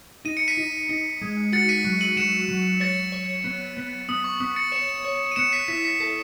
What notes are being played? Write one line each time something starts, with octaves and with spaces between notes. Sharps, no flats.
D#4 D#7
C#7
B6 D#7
D#4
D#4
G#3
F#4 A6 C#7
B6 D#7
F#3
D#7 F#7
F#3 C#7 E7
F#3
C#5 A6 C#7
C#5
B3
B3
B3 D#6
C#6
B3 D#6
A6 C#7
C#5 C#7 E7
C#5
D#7
B3 C#7 E7
B6 D#7
E4 B6
B6
A4 B6